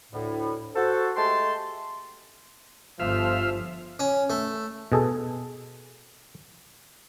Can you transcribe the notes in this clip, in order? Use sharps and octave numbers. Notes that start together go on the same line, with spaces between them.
D2 A2
F#4 A4 C5
G#3 A3 G4 A5 C6
G1 F3 F4 E5 F5
C#4
A3
B2 G#4 A4